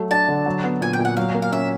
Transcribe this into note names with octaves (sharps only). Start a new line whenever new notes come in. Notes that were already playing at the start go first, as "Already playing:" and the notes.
Already playing: F#3 A3
D4 A5
D3
F#3
B3
A#2 G#5
G5
A#2
F#5
F#3 F5
A#3
F5
C#4 E5